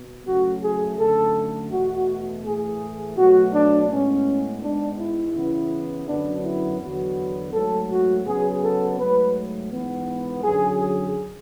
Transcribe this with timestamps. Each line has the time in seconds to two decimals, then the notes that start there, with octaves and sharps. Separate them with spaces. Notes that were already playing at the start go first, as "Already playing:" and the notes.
Already playing: B2
0.26 F#2 C#3 F#3 A3 F#4
0.63 G#4
0.98 F#2 D3 A3 A4
1.72 E2 B2 A3 F#4
2.44 A2 E3 A3 G#4
3.17 B2 F#3 A3 F#4
3.53 D4
3.89 A2 G#3 B3 C#4
4.62 G#2 G#3 B3 D4
4.98 E4
5.35 C#3 E3 B3
6.08 F#2 D3 F#3 B3 D4
6.44 E4
6.80 E2 D3 F#3 B3 F#4
7.53 G#2 F#3 A3 A4
7.89 F#4
8.25 C#3 F#3 B3 G#4
8.62 A4
8.98 G#2 F#3 A3 B4
9.71 G#2 E3 B3
10.44 F#2 D3 F#3 G#4
10.80 G#4